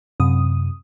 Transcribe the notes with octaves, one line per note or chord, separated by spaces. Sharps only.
F#2 C3 D#6